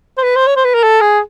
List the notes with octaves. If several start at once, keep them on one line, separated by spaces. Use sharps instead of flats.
C5
B4
C5
C#5
C5
B4
A#4
A4
G#4